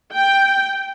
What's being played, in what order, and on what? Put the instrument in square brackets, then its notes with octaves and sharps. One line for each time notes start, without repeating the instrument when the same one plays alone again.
[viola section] G5